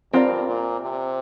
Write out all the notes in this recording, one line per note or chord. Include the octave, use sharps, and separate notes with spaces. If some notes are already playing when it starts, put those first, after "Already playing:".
G2 C4 F4 A#4 D5
A#2
C3